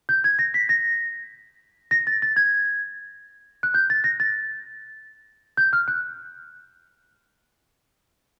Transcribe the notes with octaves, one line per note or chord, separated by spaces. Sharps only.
G6
G#6
A#6
B6
A#6
A#6
A6
A6
G#6
F#6
G6
A6
A#6
A6
G6
F6
F#6